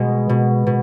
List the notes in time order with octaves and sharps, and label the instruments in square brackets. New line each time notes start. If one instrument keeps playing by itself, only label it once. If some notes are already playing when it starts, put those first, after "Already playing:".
Already playing: [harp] B2 G#3
B2
B2